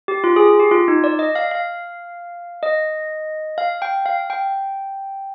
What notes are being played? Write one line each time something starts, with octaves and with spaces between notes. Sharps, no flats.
G4
F4
G#4
G4
F4
D#4
D5
D#5
F5
F5
D#5
F5
G5
F5
G5